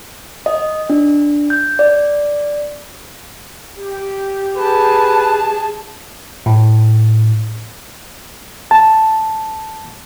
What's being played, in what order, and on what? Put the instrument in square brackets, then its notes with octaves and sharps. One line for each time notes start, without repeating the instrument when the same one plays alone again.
[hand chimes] D#5
D4
G6
D5
[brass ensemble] G4
[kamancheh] G#4 A5 [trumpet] B4
[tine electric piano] A2
[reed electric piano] A5